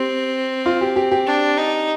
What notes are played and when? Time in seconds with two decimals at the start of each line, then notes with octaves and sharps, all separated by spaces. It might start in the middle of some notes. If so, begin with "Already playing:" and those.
Already playing: C4 G4
0.66 F4
0.81 G4
0.96 G4
1.11 G4
1.27 D4
1.58 D#4